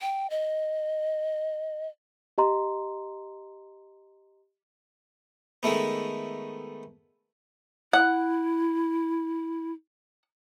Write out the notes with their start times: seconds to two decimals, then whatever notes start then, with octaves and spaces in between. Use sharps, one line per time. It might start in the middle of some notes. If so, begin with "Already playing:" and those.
0.01 G5
0.30 D#5
2.38 G4 D#5 A#5 C6
5.63 D#3 G#3 A3 B3
7.93 E4 F#5